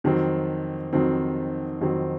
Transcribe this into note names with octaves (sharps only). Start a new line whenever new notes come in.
F2 D#3 F#3 C4
F2 D#3 F#3 C4
F2 D#3 F#3 C4